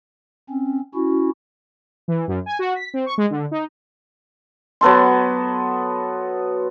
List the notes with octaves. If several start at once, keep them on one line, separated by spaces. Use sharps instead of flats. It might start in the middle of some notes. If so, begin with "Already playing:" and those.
C4 C#4
C#4 E4 F#4
E3
F#2
G#5
F#4
B6
C4
C#6
G#3
D3
D#4
F#3 B3 A4 C6